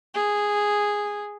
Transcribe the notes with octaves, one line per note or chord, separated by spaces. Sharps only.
G#4